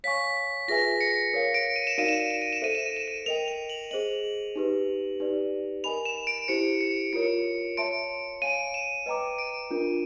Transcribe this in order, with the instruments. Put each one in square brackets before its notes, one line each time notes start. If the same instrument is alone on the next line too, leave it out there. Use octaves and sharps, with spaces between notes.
[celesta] C#5 F5 G#5 C#6 [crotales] B6
[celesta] F4 G#4 B4 E5 G#5 [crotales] A#6
[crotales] C#7
[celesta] A#4 C#5 F5
[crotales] D7
D#7
E7
[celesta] D#4 F#4 A#4 D5 F5 [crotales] D#7
[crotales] E7
D#7
E7
D#7
E7
[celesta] A4 C5 E5 [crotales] D#7
[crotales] E7
D#7
E7
D#7
[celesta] A#4 D#5 G5 [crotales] F7
[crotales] F7
F#7
[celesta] G#4 C5 D#5 [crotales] F#7
[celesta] D#4 G4 B4
D#4 G4 B4 D5
[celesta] A#4 D#5 G#5 B5 [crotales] F7
[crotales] E7
D7
[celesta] E4 G4 C5 [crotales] C#7
[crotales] C#7
[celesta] F4 A#4 C#5 [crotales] C#7
[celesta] C#5 E5 A5 C6 [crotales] D7
[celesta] C#5 F5 G#5 [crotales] D#7
[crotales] E7
[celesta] B4 D#5 G5 A#5 D6
[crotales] D7
[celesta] D4 F4 A#4